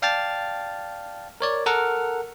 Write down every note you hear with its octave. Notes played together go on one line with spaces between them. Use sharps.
D5 F5 G5 A5 F6 A6
A#4 C#5 D5
A4 A#4 F#5 F6